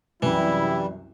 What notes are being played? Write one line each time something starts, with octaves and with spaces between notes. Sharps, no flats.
C2 F#2 E3 G3 E4